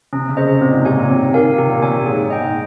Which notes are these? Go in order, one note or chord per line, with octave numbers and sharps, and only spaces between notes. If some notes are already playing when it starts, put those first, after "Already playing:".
C3 C#4
C#3
G#4 C5 D#5
C3
A#2 C4
G#2
C3
A#2 G4 C#5 G#5
A#2
C3 C4
D#3 G4 A#4 F5 G#5
C3 G4
A#2
C3 C#5 G#5
A#2
G#2 G#4
D#5 G5
G#2